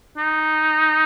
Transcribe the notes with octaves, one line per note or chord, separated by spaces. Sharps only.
D#4